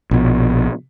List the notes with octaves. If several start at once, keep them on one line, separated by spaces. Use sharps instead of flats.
A#1 B2